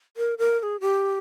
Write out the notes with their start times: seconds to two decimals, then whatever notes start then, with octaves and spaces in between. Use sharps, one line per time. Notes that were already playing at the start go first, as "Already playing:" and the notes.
0.17 A#4
0.38 A#4
0.60 A#4
0.63 G#4
0.81 G4